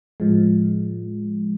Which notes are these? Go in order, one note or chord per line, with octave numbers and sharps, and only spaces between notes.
A2 F3 G#3